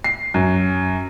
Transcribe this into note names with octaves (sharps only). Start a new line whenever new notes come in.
C7
F#2